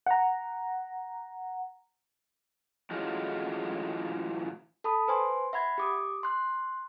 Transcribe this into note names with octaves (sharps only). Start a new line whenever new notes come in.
F#5 A#5
A2 E3 G#3 C#4 F4 F#4
A4 A5 B5 D#6
B4 C5 G#5 C6
E5 F#5 B5 G#6
G4 D6 D#6
C6 F#6